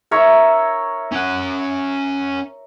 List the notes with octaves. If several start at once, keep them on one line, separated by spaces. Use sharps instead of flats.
A#4 C#5 E5
C#4 F#5